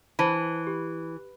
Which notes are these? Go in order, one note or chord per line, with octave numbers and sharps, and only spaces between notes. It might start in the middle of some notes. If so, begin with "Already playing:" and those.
E3 C5 A5 B5
G4